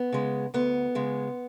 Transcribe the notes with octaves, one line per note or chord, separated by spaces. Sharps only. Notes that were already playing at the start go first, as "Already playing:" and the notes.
Already playing: B3
C#3 G#3
D2 B3
C#3 G#3